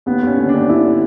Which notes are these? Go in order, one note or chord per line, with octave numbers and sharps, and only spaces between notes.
D#2 B3
D#2 C#4
D3
D4
D#2
D#2 E4
D3